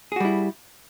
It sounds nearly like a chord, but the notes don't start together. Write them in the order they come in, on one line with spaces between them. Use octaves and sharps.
G#4 F#4 G3 E4